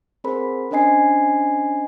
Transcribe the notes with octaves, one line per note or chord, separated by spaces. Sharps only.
C4 G#4 A#4 C5 B5
C#4 D4 C5 D#5 G#5 C7